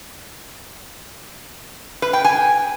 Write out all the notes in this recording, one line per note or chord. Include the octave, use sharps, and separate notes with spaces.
B4
G5
G#5